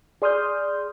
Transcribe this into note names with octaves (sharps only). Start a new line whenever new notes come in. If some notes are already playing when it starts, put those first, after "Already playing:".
G#4 D5 C6 D#6 F6 G6